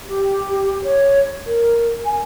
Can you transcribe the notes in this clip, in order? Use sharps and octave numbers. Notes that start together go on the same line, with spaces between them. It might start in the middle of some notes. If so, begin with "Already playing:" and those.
G4
C#5
A#4
G#5